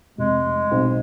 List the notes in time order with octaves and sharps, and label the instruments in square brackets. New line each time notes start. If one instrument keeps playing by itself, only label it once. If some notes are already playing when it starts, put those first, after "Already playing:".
[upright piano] F1 [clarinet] G#3
[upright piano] B1 C4